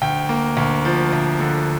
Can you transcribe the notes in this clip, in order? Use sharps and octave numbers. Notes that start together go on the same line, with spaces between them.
D2 G5
A#3
D2
F3
D2
D3